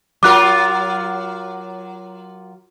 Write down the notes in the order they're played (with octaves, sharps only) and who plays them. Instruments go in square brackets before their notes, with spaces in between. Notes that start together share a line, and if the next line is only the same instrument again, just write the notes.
[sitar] F#3 F4 A#4 [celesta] D6 F#6